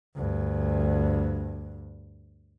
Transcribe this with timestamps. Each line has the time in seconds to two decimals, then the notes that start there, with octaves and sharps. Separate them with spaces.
0.15 D2 G2